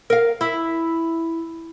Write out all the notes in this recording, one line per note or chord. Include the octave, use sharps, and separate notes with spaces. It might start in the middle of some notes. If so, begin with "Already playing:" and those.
A#4 F5
E4